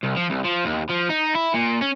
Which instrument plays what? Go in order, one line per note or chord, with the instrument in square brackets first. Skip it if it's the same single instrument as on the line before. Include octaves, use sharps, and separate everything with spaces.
[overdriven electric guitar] C2
F3
C2
F3
D#2
F3
D#4
E4
A#2
C#4